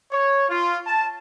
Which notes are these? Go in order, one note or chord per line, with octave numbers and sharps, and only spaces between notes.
C#5
F4
A5